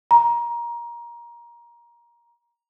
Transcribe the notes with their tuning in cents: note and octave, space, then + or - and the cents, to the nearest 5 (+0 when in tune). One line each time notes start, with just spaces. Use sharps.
A#5 +20